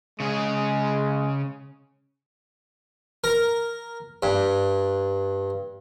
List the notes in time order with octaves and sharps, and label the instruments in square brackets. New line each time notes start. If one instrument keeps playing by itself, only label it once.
[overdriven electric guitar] C#3 G#4 [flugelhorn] G#3
[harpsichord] A#4
G2